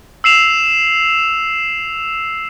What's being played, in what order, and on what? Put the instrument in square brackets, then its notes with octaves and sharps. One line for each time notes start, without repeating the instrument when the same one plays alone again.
[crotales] E6 C7 E7 F7